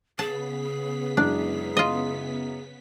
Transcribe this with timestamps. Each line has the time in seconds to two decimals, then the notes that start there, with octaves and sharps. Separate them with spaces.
0.19 C#3 B3 G#4 A5 B6
1.17 F#2 E3 G#3 D4
1.77 F4 D#5